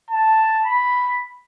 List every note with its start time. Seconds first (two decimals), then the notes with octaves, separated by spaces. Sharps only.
0.10 A5
0.65 B5